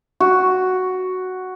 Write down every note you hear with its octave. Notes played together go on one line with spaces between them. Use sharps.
F#4